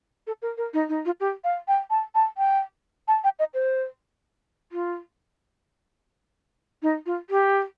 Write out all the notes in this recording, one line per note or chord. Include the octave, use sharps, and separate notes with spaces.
A4
A#4
A#4
D#4
D#4
F4
G4
F5
G5
A5
A5
G5
A5
G5
D#5
C5
F4
D#4
F4
G4